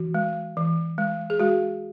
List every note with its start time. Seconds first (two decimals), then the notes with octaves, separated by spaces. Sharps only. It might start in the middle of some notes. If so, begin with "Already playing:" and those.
Already playing: E3 F#4
0.14 G#3
0.57 E3
0.98 G#3
1.30 G#4
1.40 G#3 F#4